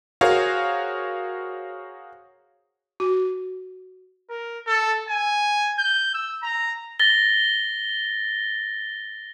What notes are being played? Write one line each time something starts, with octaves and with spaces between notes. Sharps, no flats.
F#4 G#4 A#4 C5 C#5 F5
F#4
A#4
A4
G#5
G6
E6
A#5
A6 A#6 G7